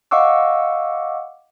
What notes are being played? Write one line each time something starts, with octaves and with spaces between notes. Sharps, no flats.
D#5 F5 F#5 C#6 D6 E6